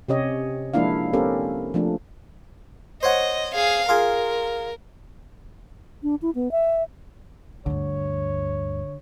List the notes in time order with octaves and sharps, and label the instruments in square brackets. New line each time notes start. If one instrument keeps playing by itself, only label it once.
[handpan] C3 C#4 G4 C#5 D#5
F3 G#3 A#3 D4 E4 F5
A#3 C4 C#4 G4 A4 A#4
F3 A3 D4
[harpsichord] C5 C#5 F#5 [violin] D#5
[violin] G#4 F5
[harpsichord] F4 G#4 [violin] A#4
[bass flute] D4
E4
B3
E5
[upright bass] D2 G2 [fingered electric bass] D3 [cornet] C#5